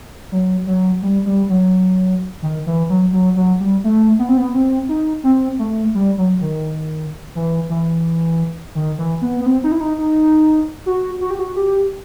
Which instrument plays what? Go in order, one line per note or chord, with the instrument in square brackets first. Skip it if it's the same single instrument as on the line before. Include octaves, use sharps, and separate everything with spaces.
[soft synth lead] F#3
F#3
G3
G3
F#3
D#3
E3
F#3
F#3
F#3
G3
A3
B3
C4
B3
C4
D#4
C4
A3
G3
F#3
D#3
E3
E3
D#3
E3
B3
B3
C4
D#4
E4
D#4
D#4
F#4
F#4
G4
F#4
G4